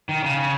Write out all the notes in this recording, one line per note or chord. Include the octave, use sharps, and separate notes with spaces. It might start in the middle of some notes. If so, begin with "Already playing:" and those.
D#3
C#3